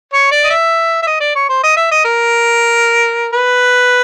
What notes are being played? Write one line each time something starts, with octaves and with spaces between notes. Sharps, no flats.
C#5
D5
D#5
E5
E5
D#5
D5
C#5
C5
D#5
E5
D#5
A#4
B4